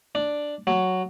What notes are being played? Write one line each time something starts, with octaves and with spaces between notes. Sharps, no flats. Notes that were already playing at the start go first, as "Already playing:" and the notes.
D4
F#3